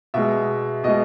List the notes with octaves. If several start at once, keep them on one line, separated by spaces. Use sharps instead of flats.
B2 G#3 E5
B2 G#3 D#5